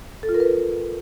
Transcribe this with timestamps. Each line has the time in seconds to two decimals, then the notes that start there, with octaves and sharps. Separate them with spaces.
0.23 A4
0.29 F4
0.34 A#4
0.40 B4